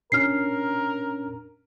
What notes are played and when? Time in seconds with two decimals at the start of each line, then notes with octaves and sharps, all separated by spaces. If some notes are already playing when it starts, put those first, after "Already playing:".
0.12 A#2 C#4 D4 A#4 F6 C7